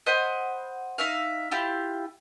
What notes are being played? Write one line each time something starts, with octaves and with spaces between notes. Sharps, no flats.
C5 D#5 F#5 B5
D#4 E5 F5
E4 F4 G4